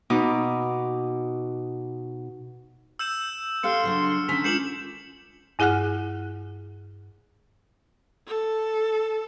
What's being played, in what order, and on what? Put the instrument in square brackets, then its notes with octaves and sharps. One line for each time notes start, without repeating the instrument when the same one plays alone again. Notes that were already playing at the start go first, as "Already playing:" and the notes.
[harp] B2 D#4 D6
[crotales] E6 G6 E7
[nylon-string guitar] G4 F5 G5 [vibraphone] A4 [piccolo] C6 [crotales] F6 C#7
[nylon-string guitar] C#3 F#3 D4
[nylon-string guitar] D3 D#3 G#5 [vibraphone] C#4 [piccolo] B6
[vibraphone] G#3 D4 F4 [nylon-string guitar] A#4 [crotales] G6 C#7 F#7 [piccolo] E7
[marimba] G2 E4 G#4 F#5 F6 F#6
[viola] A4